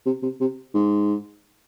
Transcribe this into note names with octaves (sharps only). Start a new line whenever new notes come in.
C3
C3
C3
G#2